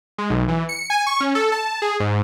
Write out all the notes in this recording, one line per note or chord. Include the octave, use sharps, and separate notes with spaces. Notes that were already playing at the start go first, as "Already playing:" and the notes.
G#3
B1
E3
C#7
G#5
C#6
C#4
A4
A5
G#4
G#2